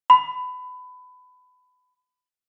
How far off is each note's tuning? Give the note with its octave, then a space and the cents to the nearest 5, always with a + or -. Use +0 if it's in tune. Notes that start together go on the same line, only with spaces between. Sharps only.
B5 +25